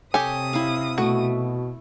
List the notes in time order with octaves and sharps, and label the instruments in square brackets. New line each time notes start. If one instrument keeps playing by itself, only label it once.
[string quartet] C3 D#6 [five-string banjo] G4 G#5 [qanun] A4 C#5
[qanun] E4 F5
[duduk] B2 [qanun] A3 [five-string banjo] F#4